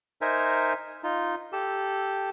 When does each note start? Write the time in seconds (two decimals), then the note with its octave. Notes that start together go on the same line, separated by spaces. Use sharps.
0.21 D#4 A#4 C5 E5 G#5
1.03 D#4 F4
1.53 G4 A4 E6